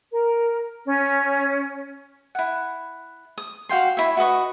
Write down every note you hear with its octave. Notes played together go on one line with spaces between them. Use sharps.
A#4
C#4
E4 F#5
D#6
F#4 F5 G5 C6
E4 C#5 E5
F#4 B4 D#5 C#6